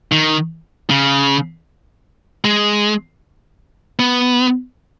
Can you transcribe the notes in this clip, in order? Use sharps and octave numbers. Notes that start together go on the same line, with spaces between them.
D#3
C#3
G#3
B3